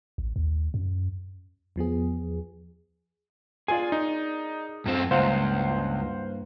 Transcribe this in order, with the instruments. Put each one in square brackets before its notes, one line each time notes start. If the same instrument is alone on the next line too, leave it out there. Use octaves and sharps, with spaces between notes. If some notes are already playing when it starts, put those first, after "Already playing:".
[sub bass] A1
D#2
F#2
[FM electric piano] E2 F3 B3 G#4
[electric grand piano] F4 G#5 [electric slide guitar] G#4 A#4 D5
[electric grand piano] D#4
[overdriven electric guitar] F#2 C4
[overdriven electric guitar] C#2 [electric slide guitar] G2 A#3 [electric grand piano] C5 F5 F#5